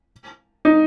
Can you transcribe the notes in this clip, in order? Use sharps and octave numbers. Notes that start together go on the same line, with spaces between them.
D#4